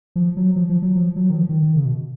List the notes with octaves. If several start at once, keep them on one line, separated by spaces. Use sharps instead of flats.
F3
F#3
F3
F3
F#3
F3
F#3
D#3
F3
D#3
D#3
C#3
B2